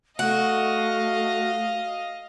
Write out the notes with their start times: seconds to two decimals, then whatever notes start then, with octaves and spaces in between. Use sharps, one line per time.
0.19 A3 F#4 D#5 F5